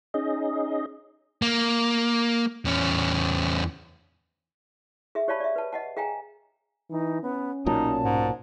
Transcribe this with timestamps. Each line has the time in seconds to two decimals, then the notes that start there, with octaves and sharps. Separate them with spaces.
0.14 C#4 D#4 G#4 D#5
1.42 A#3
2.65 E2 C#4
5.15 G#4 E5
5.28 G4 C#5 D5 F5 A5 B5
5.40 D5 E5
5.56 B4 A5
5.72 D#5 F#5 A5
5.97 G#4 F5 G5 G#5 A#5
6.90 E3 D#4
7.22 B3 C#4
7.66 B1 A#2 F#3 D#4 A5
8.04 G#2